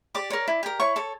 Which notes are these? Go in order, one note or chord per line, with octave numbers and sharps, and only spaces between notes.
G4 D5 D6
A#4 C#5
E4
G4 A#4
E4 C#5 C#6
A4 C#5